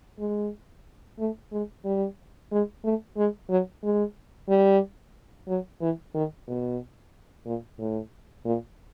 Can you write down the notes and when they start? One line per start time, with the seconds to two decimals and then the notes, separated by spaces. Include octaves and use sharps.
0.19 G#3
1.19 A3
1.52 G#3
1.85 G3
2.51 G#3
2.84 A3
3.17 G#3
3.49 F#3
3.83 G#3
4.49 G3
5.48 F#3
5.81 E3
6.14 D#3
6.47 B2
7.45 A#2
7.79 A2
8.45 A#2